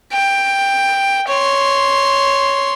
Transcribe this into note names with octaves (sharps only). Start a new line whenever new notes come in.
G5
C#5 C6